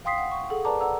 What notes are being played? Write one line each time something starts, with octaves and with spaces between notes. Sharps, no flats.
F5 G5 C6 D#6 B6 C7
F#5
C#6
G#4 A4 F#5
A#4 B4 D5 A5 A#5 D6
D5 F#5 A#5 E6